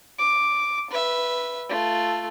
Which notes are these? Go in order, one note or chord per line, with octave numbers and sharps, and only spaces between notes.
D6
B4 E5
A3 F4